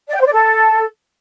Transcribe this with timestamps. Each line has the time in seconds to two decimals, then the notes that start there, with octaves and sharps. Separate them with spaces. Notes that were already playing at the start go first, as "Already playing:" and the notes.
0.09 D5
0.15 G5
0.20 C5
0.26 D5
0.32 A4